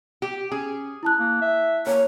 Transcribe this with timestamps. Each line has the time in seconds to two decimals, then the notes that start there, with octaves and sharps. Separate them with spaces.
0.22 G4
0.52 C#4 G#4
1.03 E4 A5 F#6
1.19 A#3
1.42 E5
1.87 A#3 A#4 C#5